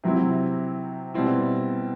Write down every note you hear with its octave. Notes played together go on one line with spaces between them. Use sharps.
C3 F#3 C4 E4
B2 G3 C4 E4